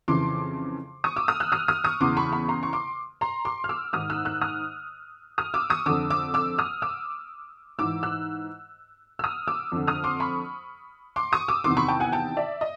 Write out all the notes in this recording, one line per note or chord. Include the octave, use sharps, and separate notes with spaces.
F2 C#3 E3 C6 D6
C#6 D#6
D6 E6
D#6 F6
E6 F#6
D#6 F6
D#6 F6
C#6 D#6
E2 C#3 E3 C6 D6
B5 C#6
B5 C#6
A#5 C6
C#6
C6 D6
A#5 C6
C6 D6
F6
D6 E6
G#2 D#3 D#6 F6
E6 F#6
E6 F#6
D#6 F6
D#6 F6
D6 E6
C#6 D#6
F2 D3 D6 E6
D6 E6
D6 E6
D#6 F6
D6 E6
G#2 E3 D6 E6
E6 F#6
E6
D#6 F6
D6 E6
F2 D3
D#6 F6
C6 D6
B5 C#6
C6 D6
C#6 D#6
D6 E6
E2 C3 D#3 C6 D6
B5 C#6
G5 A5
F#5 G#5
G5 A5
D5 E5
D#5